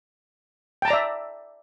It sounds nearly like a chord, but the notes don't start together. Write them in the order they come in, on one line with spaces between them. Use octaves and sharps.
G5 A5 A#5 D5 E5